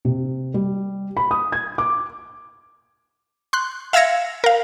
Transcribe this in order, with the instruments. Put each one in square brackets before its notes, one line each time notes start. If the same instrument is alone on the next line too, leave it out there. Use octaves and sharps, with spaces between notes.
[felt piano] C3
G3
B5
D#6
G#6
D6
[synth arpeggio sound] C6 F#6
E5 F5 E6 G#6 A#6 C#7
A#4 F5